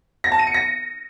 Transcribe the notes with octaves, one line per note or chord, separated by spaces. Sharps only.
A#6
A5
D#7
C#7
A#6